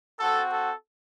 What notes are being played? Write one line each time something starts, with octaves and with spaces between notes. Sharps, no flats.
C4 F#4 A4
A4